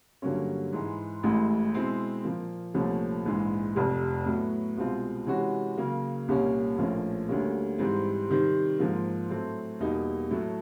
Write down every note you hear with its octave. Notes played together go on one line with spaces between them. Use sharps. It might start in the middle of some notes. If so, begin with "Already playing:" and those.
G2 D3 F#3 A#3 C#4
G#2 E3 G#3
A1 A2 E3 G#3
B2 G#3 C4 E4
A#2 F3 A#3
C2 A#2 F3 A3 C#4
A#1 G#2 E3 G#3
F1 F2 C3
A2 F#3 B3
C2 B2 G#3 C4 F4
C3 E3 G#3 C#4 F#4
C#3 F#3 A#3
C2 A#2 G3 A#3 C#4
A#1 A2 F3 A#3 C#4
D2 D3 G3 A#3 C#4
G#2 E3 G3 C4
C3 D#3 G3 C4
G#2 F3 A#3
A2 F#3 A3 C4
E2 B2 G3 A#3 D#4
A2 F#3 A3